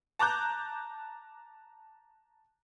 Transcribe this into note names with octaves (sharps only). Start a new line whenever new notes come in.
A5 A#5 D6 F#6 G6